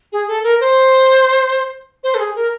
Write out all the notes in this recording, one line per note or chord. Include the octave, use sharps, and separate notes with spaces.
G#4
A4
A#4
C5
C5
A4
G#4
A#4